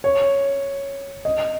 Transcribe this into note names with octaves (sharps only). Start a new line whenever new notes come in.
C#5
D#5